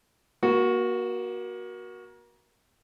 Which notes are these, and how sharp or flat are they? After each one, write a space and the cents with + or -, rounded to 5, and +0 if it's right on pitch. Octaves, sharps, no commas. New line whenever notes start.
A#3 +30 F#4 +0